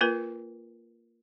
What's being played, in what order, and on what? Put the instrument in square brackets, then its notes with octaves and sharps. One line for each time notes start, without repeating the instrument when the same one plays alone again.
[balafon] A#3 F4 A#4 B4